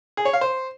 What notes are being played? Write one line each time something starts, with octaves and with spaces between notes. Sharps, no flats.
G#4
C#5
F5
C5